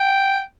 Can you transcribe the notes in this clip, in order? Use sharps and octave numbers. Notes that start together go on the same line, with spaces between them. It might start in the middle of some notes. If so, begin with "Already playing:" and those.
Already playing: G5